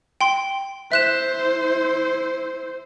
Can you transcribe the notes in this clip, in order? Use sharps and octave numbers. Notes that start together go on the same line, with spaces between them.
G5 C6
E4 C5 E5 F#6 E7